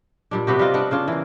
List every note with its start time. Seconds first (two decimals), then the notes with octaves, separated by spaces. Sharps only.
0.31 A#2 G3 D4
0.47 C3 B3 F#4 G4
0.59 G3 C4 F4 D#5
0.74 B3 D4 F#5
0.91 C#3 D4 F4
1.08 E3 A#3